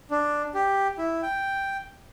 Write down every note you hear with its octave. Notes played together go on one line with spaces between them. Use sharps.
D4
G4
E4
G5